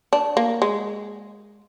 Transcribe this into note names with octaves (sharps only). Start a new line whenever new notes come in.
D4
A#3
G#3